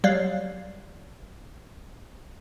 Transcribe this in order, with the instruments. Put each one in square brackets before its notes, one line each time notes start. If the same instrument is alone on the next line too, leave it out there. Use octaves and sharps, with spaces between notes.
[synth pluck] F#3 G3 F5